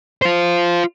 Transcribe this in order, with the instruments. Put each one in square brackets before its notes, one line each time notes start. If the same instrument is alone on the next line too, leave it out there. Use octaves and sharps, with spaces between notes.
[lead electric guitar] F4 C5